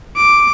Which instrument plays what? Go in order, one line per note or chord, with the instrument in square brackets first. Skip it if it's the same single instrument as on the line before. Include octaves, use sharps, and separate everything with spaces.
[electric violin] D6